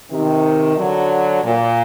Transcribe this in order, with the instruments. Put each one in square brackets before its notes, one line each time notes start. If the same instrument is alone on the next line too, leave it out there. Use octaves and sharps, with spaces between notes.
[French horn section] C3 D#3
D3 F#3
A#2